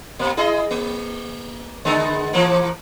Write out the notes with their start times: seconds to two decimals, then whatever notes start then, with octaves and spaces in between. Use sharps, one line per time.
0.19 B2 A#3
0.37 E4 G#4 D#5
0.71 A#3
1.85 D3 G#3 B3
2.33 E3 F3 A#3